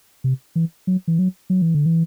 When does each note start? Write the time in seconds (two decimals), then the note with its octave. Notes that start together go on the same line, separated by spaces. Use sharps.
0.24 C3
0.56 E3
0.87 F#3
1.08 E3
1.19 F#3
1.50 F#3
1.62 E3
1.74 D3
1.86 E3